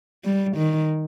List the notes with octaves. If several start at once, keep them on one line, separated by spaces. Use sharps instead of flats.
G3
D#3